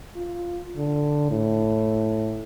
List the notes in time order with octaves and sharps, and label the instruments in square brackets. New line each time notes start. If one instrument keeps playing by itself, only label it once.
[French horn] F4
D3
A2